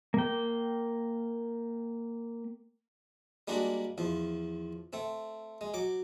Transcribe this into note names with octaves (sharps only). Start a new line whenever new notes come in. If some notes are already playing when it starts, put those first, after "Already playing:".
A#3 G5
G3 G#3 A#3 D4 F#4
E2 F3
A3 C4
G#3
F#3 D6